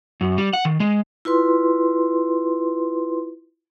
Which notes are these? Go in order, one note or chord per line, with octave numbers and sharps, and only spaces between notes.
F#2
G3
F#5
D#3
G#3
E4 F4 B4 C6